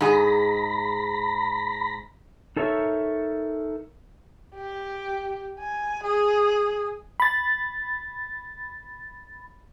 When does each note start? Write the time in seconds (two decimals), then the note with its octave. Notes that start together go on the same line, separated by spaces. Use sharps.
0.01 G#2 G#4 A#5 B5
2.56 D#4 A4 A#4 C#5 E5
4.56 G4
5.59 G#5
6.04 G#4
7.20 B5 A6